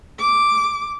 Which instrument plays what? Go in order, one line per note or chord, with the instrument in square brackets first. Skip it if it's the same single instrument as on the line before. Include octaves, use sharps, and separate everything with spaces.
[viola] D6